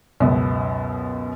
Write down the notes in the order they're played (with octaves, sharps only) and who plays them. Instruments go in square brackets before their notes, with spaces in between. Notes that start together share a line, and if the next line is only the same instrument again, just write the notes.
[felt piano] C#2 F#2 B2